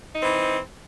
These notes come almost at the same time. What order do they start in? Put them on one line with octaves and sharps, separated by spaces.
D#4 C4 E3